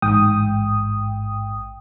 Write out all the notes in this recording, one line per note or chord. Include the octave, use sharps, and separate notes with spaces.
A1 G#2 G5 D#6